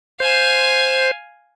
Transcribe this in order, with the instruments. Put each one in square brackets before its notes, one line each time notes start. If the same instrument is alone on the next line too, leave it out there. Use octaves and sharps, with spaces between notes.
[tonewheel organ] C5 [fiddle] F5 G#5